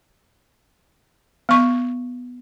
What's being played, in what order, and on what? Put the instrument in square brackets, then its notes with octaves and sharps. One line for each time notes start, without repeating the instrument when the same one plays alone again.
[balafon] B3 C#6